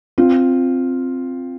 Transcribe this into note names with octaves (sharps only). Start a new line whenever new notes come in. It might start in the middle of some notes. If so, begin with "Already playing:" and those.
C4 F4